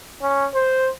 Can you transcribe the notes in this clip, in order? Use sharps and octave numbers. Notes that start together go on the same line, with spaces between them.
C#4
C5